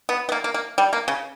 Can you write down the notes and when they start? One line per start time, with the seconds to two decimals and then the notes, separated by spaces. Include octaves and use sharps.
0.09 B3
0.29 B3
0.32 A#3
0.44 A#3
0.54 A#3
0.78 G3
0.93 A#3
1.08 C#3